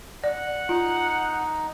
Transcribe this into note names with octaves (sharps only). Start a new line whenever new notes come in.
D5 F#5
D#4 F4